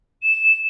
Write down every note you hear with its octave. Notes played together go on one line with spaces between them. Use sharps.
E7